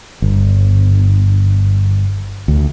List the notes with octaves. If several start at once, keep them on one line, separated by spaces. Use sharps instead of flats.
G1
D2